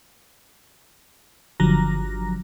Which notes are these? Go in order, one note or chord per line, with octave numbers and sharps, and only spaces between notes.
G1 D3 F3 F#3 A#5 A#6